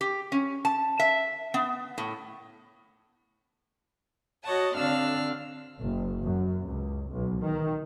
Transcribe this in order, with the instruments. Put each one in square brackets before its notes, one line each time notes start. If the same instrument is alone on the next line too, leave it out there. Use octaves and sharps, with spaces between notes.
[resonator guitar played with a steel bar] G4
C#4
A5
E5
B3
A2
[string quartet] F#4 C#5 D#5 F#5 A5
D3 C4 D4 F5 E6 F6
[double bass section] F#1
F#2
C#2
B1
D#3